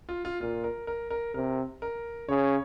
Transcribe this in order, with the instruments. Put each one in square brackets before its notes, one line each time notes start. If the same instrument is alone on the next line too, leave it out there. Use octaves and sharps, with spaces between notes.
[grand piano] F4
F4
[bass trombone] A#2 [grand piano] F4
[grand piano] A#4
A#4
A#4
[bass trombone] C3 [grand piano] A#4
[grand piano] A#4
[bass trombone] C#3 [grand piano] C#5